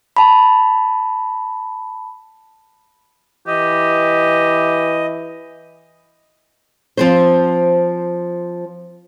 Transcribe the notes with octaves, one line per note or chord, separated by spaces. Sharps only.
A5 B5
E3 G4 D#5
F3 C4 C5